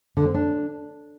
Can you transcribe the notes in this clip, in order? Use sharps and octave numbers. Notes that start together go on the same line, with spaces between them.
D3
C4
D4